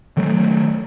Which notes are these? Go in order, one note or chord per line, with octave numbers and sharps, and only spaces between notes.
D#3 F#3 A3